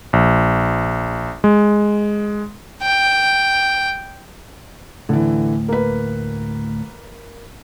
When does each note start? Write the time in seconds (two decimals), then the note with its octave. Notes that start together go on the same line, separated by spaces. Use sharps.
0.13 A#1
1.44 G#3
2.82 G5
5.09 D2 A2 D3 E3
5.69 A#3 B4